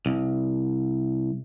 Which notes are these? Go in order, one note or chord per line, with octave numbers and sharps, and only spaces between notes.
C2